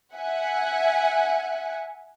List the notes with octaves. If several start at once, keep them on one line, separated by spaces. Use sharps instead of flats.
E5 F#5 G#5